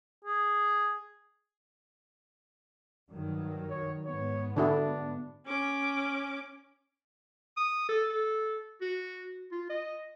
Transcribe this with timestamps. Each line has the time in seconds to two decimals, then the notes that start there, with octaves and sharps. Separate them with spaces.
0.25 G#4
3.11 G2 D#3 F#3
3.70 C#5
4.06 G#2 B3 C#5
4.56 D3 D4 E4 F#4
5.46 C#4 D6
7.57 D#6
7.89 A4
8.09 A4
8.81 F#4
9.52 F4
9.70 D#5